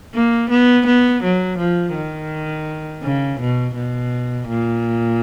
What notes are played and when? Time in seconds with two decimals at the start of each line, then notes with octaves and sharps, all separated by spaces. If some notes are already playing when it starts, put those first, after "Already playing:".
0.14 A#3
0.51 B3
0.87 B3
1.23 F#3
1.59 F3
1.95 D#3
3.03 C#3
3.40 B2
3.76 B2
4.48 A#2